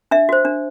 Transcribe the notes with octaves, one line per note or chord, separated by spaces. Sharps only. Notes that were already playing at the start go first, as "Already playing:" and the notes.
D4 E5
F#4 C5
D4